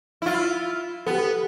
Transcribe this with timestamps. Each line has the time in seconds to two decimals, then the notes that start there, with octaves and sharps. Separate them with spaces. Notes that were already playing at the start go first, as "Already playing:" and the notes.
0.22 E4 F4
1.07 B3 G4 A4